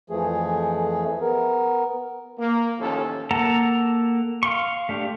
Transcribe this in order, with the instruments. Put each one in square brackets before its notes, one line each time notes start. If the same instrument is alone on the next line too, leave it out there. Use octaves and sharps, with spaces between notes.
[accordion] F2 E3 F3 A3 G#4
B3 A#4
[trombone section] A#3
A1 D#2 A2 F3 C#4 A4
[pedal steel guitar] A#3 A4 F#5 A5 A#5
F5 C6 C#6
A3 D4 G4